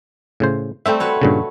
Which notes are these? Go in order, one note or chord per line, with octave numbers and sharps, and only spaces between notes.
A2 C#3 C5
G3 A3 C4 E5 G5
F#4 B4 C#5
G2 A#2 C#3